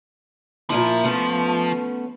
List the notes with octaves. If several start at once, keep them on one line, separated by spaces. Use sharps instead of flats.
A#2 F3 A#3 E4
A3 B3 C#4